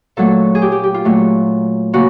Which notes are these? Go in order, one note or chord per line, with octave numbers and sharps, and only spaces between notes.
A#2 F#3 A3 A4
G#4
G4
G4
G4
F4
A#2 F#3 A3
C#3 A#3 F#4